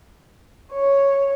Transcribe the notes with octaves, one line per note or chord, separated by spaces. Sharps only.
C#5